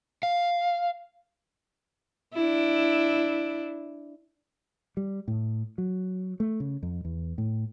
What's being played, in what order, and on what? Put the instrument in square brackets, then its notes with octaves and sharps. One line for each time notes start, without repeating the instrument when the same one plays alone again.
[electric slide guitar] F5
[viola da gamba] D4 E4
[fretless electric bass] G3
A2
F#3
A3
C#3
F2
E2
A2